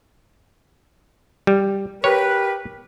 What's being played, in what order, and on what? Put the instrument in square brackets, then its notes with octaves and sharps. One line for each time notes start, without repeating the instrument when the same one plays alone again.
[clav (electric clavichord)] G3
[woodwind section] G4 A#4 B4 [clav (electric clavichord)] C#5